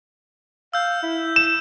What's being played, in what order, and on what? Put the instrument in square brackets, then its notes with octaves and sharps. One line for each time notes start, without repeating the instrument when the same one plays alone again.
[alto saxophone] F5 [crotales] E6 G6
[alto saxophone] E4
[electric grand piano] E7